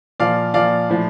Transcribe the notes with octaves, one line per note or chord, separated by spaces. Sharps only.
A#2 F3 D5 F5
A#2 F3 D5 F5
A2 F3